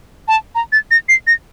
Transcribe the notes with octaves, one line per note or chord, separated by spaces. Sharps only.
A5
A#5
A6
A#6
C7
A#6